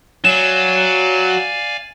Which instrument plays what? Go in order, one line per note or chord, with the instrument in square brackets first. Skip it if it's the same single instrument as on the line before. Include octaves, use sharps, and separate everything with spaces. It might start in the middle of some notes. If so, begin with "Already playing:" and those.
[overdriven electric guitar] F#3 [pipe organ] D5 F5 G#5 [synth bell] E7